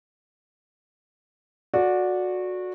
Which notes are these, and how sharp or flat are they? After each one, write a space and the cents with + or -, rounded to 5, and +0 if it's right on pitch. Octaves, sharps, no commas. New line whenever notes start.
F#4 -20 A4 +0 D5 -5